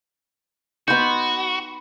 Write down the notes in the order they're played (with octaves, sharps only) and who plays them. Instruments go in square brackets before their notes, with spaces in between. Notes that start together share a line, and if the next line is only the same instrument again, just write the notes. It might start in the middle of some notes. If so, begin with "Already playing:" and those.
[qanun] B3 D#4 [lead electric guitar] F#4 [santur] B5 C6 [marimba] G6